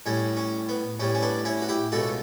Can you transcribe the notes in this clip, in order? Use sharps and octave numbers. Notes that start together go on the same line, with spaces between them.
A2 G3 C#4
C#4
B3
A2 G3 C#4
C#4
B3 D4
C#4 E4
F#4
E4 G4
C#2 B2 A3 F#4 A4